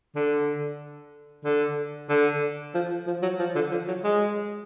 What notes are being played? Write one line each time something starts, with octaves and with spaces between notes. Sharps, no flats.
D3
D3
D3
F3
F3
F#3
F3
D3
F3
F#3
G#3